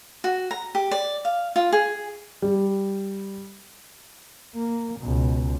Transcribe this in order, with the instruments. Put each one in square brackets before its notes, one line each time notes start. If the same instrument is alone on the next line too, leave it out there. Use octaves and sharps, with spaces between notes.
[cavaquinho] F#4
A#5
G4
D5
F5
F4
G#4
[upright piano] G3
[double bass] A#3
C#2 B2